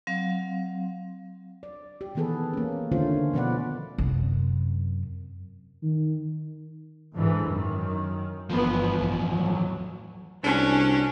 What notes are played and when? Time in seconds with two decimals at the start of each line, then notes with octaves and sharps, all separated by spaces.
0.07 F#3 C4 F5
1.63 D5
2.01 G4
2.15 D#3 E3 B3 G#4 A4 B4
2.54 A#3 C#4
2.92 D3 D#3 A3 C#4 F4 C5
3.34 B2 F3 B3 B4 D5 F#5
3.98 F#2 C3
5.83 D#3
7.14 G#2 D3 E3
7.46 F#2 D#3
8.49 G1 E2 F3 B3
8.95 A1
9.33 A2 F#3
10.44 C2 C#4 D4 F#4